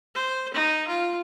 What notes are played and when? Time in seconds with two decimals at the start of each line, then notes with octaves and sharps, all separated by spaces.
0.15 C5
0.54 D#4
0.88 F4